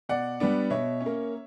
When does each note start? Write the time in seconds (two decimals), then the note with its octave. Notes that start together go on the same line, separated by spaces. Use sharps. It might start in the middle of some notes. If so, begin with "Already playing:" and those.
0.09 B2 D5 F#5
0.40 G3 B3 D4
0.70 B2 C#5 E5
1.01 C#4
1.06 A#3